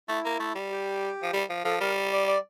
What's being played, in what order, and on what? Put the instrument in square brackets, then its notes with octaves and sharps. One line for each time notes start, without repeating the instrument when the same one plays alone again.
[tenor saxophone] A3 [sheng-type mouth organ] E4
[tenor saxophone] A#3
A3
G3
[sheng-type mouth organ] G4
[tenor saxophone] F3
G3
F3
[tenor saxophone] F3 [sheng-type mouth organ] A4
[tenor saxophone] G3 [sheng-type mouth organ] A#4
[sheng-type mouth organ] D5
D5